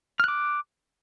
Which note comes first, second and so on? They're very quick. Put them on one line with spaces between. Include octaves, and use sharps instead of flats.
F6 F#6 D6